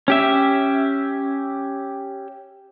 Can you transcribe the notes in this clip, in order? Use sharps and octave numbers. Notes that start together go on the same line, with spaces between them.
C#4 G4 E5